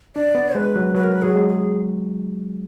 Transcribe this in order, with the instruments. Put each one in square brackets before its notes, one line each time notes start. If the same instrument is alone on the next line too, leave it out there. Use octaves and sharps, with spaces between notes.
[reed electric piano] D4 [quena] D5
[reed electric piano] B3
[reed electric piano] G#3 [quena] B4
[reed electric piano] F#3
[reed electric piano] F#3 [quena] B4
[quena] A#4
B4
[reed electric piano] F#3 [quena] G#4
[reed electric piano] G#3
[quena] G#4